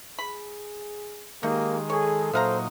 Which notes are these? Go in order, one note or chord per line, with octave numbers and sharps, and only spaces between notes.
G#4 B5
D#3 G#3 A#3 D#4 G4
G#4 A4 C#5
A#2 F#3 D#4 C5 E5 F5 A#5